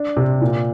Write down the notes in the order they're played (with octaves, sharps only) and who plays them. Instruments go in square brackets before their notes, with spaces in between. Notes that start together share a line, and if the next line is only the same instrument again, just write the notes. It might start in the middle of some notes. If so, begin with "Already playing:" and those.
Already playing: [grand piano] D4
C3
A#2